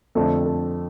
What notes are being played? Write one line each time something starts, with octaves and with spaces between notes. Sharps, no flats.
F2 D3 A3 C4 A4
A4